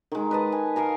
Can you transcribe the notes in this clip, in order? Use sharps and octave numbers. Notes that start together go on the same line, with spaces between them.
D#3 G#3
B4 D#5 A5
G#5
A#4 F5 G#5 A#5